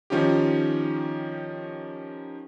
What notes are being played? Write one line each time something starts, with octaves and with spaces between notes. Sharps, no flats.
D#3 F3 C#4 D#4 F4 G4